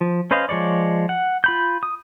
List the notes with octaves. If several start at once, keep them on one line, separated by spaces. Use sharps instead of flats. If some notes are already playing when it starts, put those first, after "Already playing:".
F3
C#4 B4 C5 D#5 F5
F3 G#3 C#5 D5
F#5
F4 B5 G6
D#6